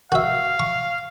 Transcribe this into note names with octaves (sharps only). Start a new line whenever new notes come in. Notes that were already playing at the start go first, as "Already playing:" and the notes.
F#4 E5 F5
C#6